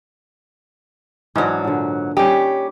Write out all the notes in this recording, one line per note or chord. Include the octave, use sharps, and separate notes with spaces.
G#2 E3 F#3 D4
A#2 D3
G3 C#4 D#4 G4